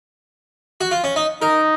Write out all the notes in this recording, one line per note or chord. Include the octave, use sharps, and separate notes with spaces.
F#4
F4
C#4
D#4
D#4 A#4